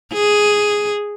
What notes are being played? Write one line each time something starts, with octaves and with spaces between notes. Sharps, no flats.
G#4